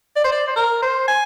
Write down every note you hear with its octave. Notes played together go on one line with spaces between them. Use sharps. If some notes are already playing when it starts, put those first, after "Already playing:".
D5
C5
D5
C5
A#4
C5
G#5